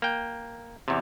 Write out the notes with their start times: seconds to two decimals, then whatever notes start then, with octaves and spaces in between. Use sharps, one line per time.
0.02 A#3 G5
0.88 E2 C3